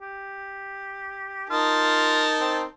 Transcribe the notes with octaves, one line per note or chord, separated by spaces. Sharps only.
G4
D#4 F4 A#4 A5
C4